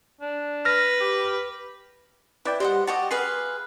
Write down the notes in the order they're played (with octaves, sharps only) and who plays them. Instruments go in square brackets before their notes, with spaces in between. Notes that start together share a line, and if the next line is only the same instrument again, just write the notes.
[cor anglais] D4
[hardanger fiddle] B4 [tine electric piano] F6 A#6
[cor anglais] G4
[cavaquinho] E4 [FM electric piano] B4 D5 G5
[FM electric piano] G3 [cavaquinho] C5 D#5 F#5
[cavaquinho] F#4 G4 D#5 [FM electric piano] A5
[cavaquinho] G#4 B4 F5 [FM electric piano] C6